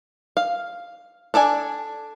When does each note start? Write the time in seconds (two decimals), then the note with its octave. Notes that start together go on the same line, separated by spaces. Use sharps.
0.37 F5
1.34 D4 A4 D5 G#5